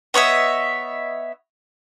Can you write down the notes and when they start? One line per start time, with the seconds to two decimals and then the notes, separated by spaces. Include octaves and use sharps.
0.14 B3 C#5 D#5 E5